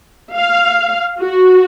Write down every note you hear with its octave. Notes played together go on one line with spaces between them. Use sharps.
F5
F#4